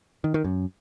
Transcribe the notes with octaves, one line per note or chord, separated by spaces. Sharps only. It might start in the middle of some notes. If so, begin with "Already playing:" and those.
D#3
D#3
F#2